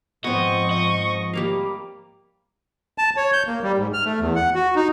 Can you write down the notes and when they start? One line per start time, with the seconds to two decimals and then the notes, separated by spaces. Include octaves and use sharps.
0.24 G#2 F3 B3 C4 D#5 C#6
0.71 D#5
1.33 G3 A#3 F5
2.98 A5
3.17 C#5
3.33 G6
3.47 A#3
3.63 G3
3.78 G#2
3.94 F6
4.05 A3
4.20 E2
4.36 F#5
4.55 F#4
4.76 D#4